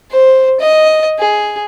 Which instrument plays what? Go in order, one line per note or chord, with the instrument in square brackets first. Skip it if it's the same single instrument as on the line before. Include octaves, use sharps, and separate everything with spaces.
[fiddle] C5
D#5
G#4